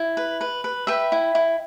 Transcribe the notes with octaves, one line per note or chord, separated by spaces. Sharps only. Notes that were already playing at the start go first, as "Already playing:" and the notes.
Already playing: E4
B4
B4
B4
B4 E5 G5
E4
E4